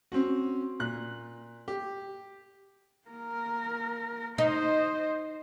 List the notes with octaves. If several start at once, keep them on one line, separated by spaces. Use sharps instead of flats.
C4 C#4 F#4
A#2 F#6
G4
A#3 A#4
D#4 C5 D#5